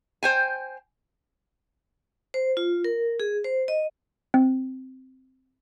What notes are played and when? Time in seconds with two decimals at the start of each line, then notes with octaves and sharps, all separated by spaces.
0.23 C5 G5 G#5
2.34 C5
2.57 F4
2.84 A#4
3.20 G#4
3.44 C5
3.68 D#5
4.34 C4